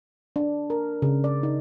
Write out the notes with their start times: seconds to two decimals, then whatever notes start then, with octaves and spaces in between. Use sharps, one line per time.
0.36 D4
0.70 A#4
1.02 C#3
1.24 D5
1.43 D#4